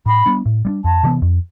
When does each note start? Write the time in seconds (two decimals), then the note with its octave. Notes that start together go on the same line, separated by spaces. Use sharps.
0.06 A2 B5
0.26 G3 B3 D4
0.46 A2
0.65 G3 B3 D4
0.84 F2 A5
1.03 C3 E3 B3
1.22 F2